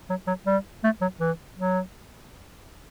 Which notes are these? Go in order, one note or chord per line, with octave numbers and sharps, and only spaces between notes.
F#3
F#3
G3
A3
F#3
E3
F#3